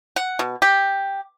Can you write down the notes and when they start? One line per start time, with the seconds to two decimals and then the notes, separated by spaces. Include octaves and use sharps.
0.16 F#5
0.39 B2
0.62 G4